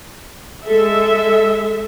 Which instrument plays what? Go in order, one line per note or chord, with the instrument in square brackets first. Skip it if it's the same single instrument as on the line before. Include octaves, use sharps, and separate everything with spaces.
[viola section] G#3 A4 E5